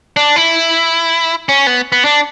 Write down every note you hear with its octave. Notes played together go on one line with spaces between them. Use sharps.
D4
E4
C#4
B3
B3
D4